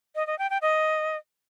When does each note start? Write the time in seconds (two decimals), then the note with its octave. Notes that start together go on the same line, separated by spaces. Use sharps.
0.15 D#5
0.27 D#5
0.39 G5
0.50 G5
0.62 D#5